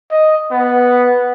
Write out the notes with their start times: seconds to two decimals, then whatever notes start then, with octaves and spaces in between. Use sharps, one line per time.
0.11 D#5
0.52 B3